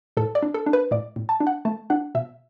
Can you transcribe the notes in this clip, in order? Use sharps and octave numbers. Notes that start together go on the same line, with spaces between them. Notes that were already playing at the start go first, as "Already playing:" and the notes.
A2 A4
D5
D4
A4
D4
B4
A2 D5
A2
A5
D4
F#5
A3 A5
D4 F#5
B2 E5